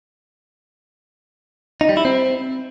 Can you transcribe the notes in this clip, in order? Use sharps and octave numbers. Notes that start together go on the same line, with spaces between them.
D#4
G3
E4
C4